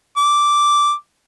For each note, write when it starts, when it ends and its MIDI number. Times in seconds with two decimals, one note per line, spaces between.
0.17 0.92 86